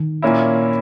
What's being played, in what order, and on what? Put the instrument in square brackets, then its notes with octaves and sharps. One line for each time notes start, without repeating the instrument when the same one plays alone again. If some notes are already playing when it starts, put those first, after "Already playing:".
Already playing: [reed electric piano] D#3
[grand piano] A#2 A#3 C#4 E4